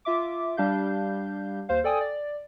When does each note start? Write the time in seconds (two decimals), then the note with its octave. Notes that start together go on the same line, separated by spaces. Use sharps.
0.05 F4 E5 D6
0.57 G3 D4 G4 F5 G6
1.69 D#2 C5 F5
1.84 A4 D5 G5 G#5 D#6
2.01 D5